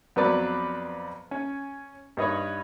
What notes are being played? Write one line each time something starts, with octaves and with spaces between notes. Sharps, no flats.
F2 F#3 B3 C4 B4 D5
C#4
G2 D#4 B4 C#5